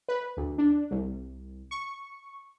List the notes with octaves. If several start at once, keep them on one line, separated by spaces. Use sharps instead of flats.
B4
D2
D4
C2
C#6